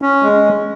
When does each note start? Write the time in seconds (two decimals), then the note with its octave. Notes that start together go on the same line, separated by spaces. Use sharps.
0.02 C#4
0.23 G#3